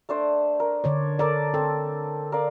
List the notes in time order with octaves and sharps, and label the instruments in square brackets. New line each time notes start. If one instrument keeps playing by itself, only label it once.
[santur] A3 D4 C5
A#4
[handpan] D3 C#5 D5
[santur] A4 A#4 A5 [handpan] D5
[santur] C4 [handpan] A4
[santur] A#4 D5 F5